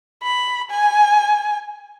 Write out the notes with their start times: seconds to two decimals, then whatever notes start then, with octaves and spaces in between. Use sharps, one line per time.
0.23 B5
0.70 G#5